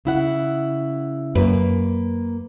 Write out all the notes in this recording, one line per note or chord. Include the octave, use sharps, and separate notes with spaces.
C#3 E4 F#5
F#2 A#3 B4